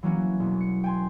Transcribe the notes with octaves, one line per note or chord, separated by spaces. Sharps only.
E3 F#3 A#3 C#4
E1 B3
C#7
G5 G#5 C6